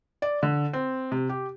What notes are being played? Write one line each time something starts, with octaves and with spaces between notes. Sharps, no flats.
D5
D3
C4
C3
G4